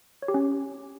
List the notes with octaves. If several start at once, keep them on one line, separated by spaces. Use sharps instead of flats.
C#5
G4
C#4